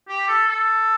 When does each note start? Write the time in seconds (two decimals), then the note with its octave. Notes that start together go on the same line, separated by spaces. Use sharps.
0.08 G4
0.28 A4
0.47 A4